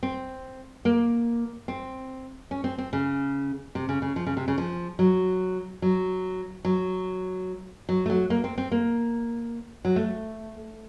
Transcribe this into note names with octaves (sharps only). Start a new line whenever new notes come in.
C4
A#3
C4
C#4
C4
C4
C#3
C3
C#3
C#3
F3
C#3
C3
C#3
F3
F#3
F#3
F#3
F#3
A3
F#3
A#3
C4
C4
A#3
F#3
A3